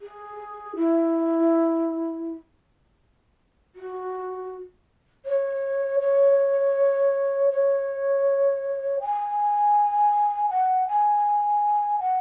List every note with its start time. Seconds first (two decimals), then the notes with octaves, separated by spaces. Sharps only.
0.01 G#4
0.76 E4
3.75 F#4
5.25 C#5
6.00 C#5
7.50 C#5
9.00 G#5
10.50 F#5
10.88 G#5
11.99 F#5